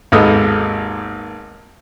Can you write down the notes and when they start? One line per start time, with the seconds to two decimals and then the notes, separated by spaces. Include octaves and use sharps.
0.12 G#1 D#2 G#3 B3 A4 D#6